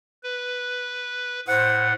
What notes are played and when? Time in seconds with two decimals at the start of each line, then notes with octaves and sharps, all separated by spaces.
0.23 B4
1.48 A2 C5 F#5